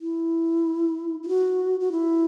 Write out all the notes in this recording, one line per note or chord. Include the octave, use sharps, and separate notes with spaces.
E4
E4
F#4
F#4
E4